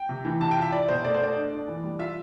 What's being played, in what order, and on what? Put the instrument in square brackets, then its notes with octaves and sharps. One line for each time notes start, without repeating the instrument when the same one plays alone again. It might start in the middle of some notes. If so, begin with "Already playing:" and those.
Already playing: [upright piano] G5
C3
E3
C3 A5
G5
F4
E5
E4 D5
B2 C5
A3 D5
C5
A3 D5
D4
D4
E3
G3
F4 E5